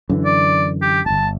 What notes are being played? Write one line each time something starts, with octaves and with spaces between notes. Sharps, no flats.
F#2 D3 E3
D5
G4
D1 G1 A5